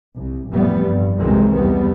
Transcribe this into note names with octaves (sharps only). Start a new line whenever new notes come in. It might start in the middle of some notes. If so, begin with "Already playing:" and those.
C2
F1 A2 E3 G3 B3
G2
C2 F#2 C3 D#3 E3 G#3
E2 G3 B3